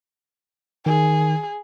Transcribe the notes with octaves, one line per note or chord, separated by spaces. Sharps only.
D#3 G#4